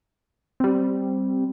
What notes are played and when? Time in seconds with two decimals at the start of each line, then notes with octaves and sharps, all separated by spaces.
0.60 G3 C4